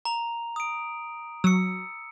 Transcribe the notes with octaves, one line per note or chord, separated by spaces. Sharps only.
A#5 F7
D#6 D7
F#3 E6 C#7